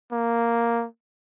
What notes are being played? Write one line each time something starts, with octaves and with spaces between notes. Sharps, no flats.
A#3